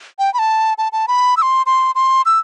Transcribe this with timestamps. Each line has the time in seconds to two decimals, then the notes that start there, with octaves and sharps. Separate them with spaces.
0.19 G5
0.34 B5
0.39 A5
0.78 A5
0.92 A5
1.08 B5
1.37 E6
1.42 C6
1.66 C6
1.95 C6
2.26 E6